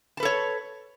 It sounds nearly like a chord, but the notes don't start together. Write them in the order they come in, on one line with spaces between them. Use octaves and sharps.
A5 B4 A4 C#5